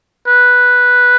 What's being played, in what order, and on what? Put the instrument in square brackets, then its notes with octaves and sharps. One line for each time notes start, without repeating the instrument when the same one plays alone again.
[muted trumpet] B4